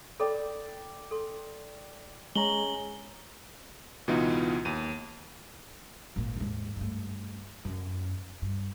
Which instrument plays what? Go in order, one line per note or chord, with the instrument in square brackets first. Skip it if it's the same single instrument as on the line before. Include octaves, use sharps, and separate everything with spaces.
[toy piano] A4 B5 [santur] D5 G5 E6
[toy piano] A4 C6
[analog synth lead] G#3 [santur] C#4 A#5 [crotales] F#7 G7
[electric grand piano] C#2 B2 E3 B3 D#4 F4
D#2 D#7
[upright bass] G#1 A#2
D#2 G#2
G2 A3
F#2
G2